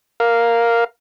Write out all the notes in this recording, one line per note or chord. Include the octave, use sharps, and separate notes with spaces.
A#4 F5